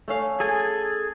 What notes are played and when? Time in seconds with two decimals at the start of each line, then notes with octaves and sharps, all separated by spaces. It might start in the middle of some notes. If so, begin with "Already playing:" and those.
0.08 A3 C#4 F5
0.40 G#4 A4 G#5